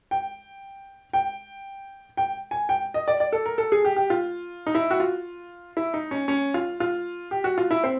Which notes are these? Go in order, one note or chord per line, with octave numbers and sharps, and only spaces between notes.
G5
G5
G5
G#5
G5
D#5
D5
D5
A4
A#4
A4
G#4
G4
G4
F4
D#4
E4
F#4
F4
E4
D#4
C#4
C#4
F4
F4
G4
F#4
F4
E4
C4